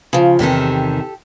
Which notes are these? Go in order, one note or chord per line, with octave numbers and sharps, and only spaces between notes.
C#3 F3
E2 C3 D#3 G4 A4